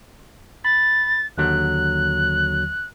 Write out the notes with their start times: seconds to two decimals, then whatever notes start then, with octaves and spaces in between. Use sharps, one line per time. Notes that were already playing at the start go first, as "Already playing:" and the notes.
0.65 B5 A6
1.38 D#2 D3 F#3 F#6